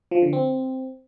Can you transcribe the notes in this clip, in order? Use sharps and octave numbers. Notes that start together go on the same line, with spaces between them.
F3
D3
C4